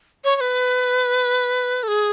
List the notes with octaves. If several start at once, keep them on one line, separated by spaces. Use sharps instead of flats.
C#5
C#5
B4
A4
G#4